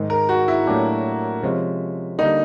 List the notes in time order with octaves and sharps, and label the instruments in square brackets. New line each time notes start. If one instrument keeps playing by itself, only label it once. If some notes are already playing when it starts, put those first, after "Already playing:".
Already playing: [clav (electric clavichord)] G#2 D#3 G#3
[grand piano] A#4
F#4
E4
[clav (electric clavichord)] A2 F#3 A#3 D4 G4
C3 F3 G#3 C#4
[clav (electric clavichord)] D3 G3 A#3 [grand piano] D#4